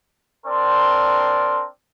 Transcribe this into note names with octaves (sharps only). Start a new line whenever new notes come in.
C4 D4 A#4 D5 C6